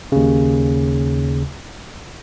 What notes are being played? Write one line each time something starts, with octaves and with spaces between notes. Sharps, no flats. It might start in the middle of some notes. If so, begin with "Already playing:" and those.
D#2 C#3